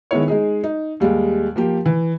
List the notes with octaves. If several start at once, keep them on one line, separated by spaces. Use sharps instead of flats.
D#3 G#3 B3 E4 C#5
G#3 D#4 G#4
D#4
D#2 G3 G#3
F3 A#3 G4
E3